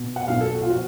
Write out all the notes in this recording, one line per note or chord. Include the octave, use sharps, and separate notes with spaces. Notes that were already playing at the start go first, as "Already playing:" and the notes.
Already playing: B2
F#5
B1 B2 F5
A4
F#4
F4
F3 F#4